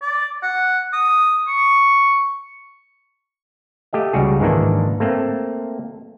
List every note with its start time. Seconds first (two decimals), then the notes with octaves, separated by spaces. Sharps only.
0.01 D5
0.43 F#5
0.93 D#6
1.48 C#6
3.93 A3 G4 D#5 F5
4.13 C#2 G3 F#4 G#4
4.40 G#2 D#3 E3 A#3 D4
5.00 A3 A#3 C4